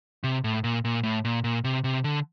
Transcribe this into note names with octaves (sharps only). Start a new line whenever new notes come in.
C3
A2
A#2
A#2
A2
A#2
A#2
C3
C3
D3